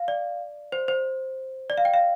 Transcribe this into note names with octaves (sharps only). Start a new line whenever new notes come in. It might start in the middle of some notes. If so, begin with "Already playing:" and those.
Already playing: F5
D5
C5
C5
D5
F5
G5
F5